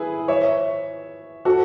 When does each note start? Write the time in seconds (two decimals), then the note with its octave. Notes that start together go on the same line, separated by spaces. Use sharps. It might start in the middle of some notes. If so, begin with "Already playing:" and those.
Already playing: E4 G#4 B4
0.28 C#5 E5
1.45 F#4 A4